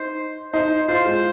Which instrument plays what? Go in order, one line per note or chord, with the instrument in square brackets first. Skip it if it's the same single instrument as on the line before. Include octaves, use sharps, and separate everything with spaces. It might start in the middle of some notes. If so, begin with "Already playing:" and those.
Already playing: [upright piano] D#4 [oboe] C5
[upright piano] D#4 [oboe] C5
[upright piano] F4 [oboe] C5
[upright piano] G#3